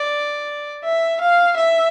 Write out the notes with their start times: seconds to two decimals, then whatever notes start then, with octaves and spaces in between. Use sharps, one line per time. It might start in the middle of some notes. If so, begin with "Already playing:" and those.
Already playing: D5
0.84 E5
1.21 F5
1.57 E5